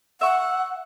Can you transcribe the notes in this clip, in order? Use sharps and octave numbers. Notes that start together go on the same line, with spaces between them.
E5 F#5 C#6